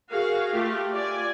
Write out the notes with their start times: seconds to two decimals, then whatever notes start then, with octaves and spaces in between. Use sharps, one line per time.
0.11 F#4 G#4 A#4 F5
0.53 A3 F4 G4
0.93 D5 G#5